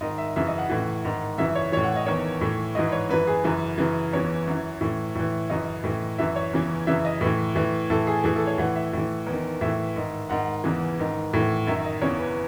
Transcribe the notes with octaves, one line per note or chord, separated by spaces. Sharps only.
G#2 D#3 D#5
E5
F#2 C#3 E3 E5
D#5
F#5
A2 E3
G#2 D#3
F#2 C#3 E3 E5
C#5
A2 E3 C#5
F#5
D#5
E2 D#3 C#5
A2 E3
G#2 E3 D#5
B4
C#5
F#2 E3 B4
G#4
F#2 C#3 E3 B4
F#2 C#3 E3
E2 C#3 E3 C#5
F#2 E3
A2 E3
A2 E3
F#2 C#3 E3 D#5
A2 E3
F#2 E3 E5
C#5
E2 C#3 E3
F#2 C#3 E3 E5
D#5
A2 E3 B4
A2 E3
A2 E3 A4
G#4
A2 E3 G#4
A4
C#5
A2 E3 F#5
E5
A2 E3
E2
D#3
A2 E3 E5
G#2 D#3
G#2 D#3 F#5
E2 C#3 E3
G#2 D#3
A2 E3
F#2 D#3 E5
D#5
E2 C#3 E3 C#5
B4